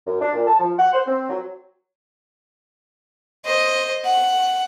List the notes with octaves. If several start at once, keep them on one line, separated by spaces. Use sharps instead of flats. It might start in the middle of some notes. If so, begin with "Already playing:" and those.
F#2
D4
A#2
A5
F3
F#5
C5
C4
F#3
C5 D#5
F#5